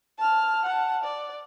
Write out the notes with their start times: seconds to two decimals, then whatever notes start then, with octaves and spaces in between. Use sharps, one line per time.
0.18 A5 F6
0.65 F#5 A5
1.04 D5